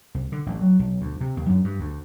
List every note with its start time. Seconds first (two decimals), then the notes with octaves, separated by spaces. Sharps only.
0.15 C2
0.32 D3
0.46 A1
0.61 F#3
0.79 B1
1.01 D2
1.21 C3
1.37 D#2
1.49 F#2
1.64 G2
1.80 D2